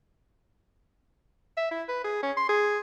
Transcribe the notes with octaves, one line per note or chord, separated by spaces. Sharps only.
E5
E4
B4
G#4
C#4
C6
G#4